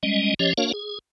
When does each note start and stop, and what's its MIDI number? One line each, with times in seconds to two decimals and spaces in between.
0.03 0.34 55
0.03 0.34 56
0.03 0.34 61
0.03 0.34 75
0.39 0.53 53
0.39 0.53 61
0.39 0.53 67
0.39 0.53 73
0.39 0.53 75
0.58 0.72 58
0.58 0.72 62
0.58 0.72 66
0.58 0.72 70
0.58 0.72 73
0.58 0.72 77
0.73 0.99 68